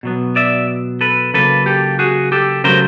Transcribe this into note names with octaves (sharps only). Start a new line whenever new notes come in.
B2 F#3 B3
D5 E5
A4 B4
C#3 F#3 A#3 A4 B4
G4 A4
F#4 G#4
G4 A4
C#3 F#3 A3 A#4 C5